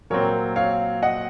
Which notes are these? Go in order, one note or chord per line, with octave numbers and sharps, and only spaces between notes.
A#2 F#3 C4 A#4 C#5
C#5 F5
D#5 F#5